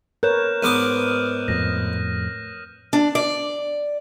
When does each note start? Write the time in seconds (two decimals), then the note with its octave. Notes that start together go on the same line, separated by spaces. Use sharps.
0.23 A#4 B4 C#5 F#6 G6 E7
0.63 G#2 B3 D6 D#6 F6 D#7
1.48 F2 A2 A#6
2.93 D4
3.15 D5